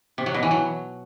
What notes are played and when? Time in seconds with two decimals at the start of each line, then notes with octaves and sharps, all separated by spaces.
0.18 C3
0.26 F#3
0.34 B2
0.43 E3
0.51 F#3